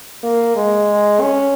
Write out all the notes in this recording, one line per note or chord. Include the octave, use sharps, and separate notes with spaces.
A#3
G#3
C#4